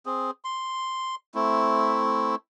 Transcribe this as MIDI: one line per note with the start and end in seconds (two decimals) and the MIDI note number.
0.06 0.31 60
0.06 0.31 68
0.45 1.15 84
1.35 2.35 57
1.35 2.35 60
1.35 2.35 64